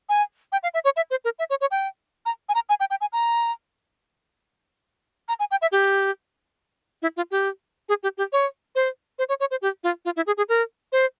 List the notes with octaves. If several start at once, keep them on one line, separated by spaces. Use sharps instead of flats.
G#5
G5
F5
E5
C#5
E5
C5
A#4
E5
C#5
C#5
G5
A#5
G#5
A#5
G#5
G5
G5
G#5
A#5
A#5
G#5
G5
E5
G4
E4
F4
G4
G#4
G4
G4
C#5
C5
C5
C#5
C#5
C5
G4
F4
F4
E4
G#4
G#4
A#4
C5